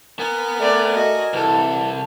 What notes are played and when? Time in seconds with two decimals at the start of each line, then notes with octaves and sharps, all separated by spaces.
0.19 B3 A#4 G#5
0.60 A3 D5
0.94 F#4 D#5
1.33 C2 E3 A4